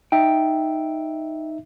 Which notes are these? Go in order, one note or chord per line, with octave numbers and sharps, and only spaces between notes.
D#4 E5 G5